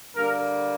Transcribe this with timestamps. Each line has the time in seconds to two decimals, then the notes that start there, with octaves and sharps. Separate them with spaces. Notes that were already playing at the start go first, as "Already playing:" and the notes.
0.15 D3 G3 A#3 D4 A#4